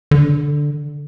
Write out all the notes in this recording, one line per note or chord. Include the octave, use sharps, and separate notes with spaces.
D3